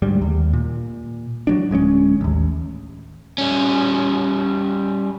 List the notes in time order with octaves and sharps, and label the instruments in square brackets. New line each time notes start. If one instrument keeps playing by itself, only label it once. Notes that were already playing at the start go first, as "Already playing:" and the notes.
[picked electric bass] D2 G#2 G3
D#2
A#2
F#3 G3 D4
D1 G#3 B3 C#4
A1 D#2
[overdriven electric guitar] G3 C#4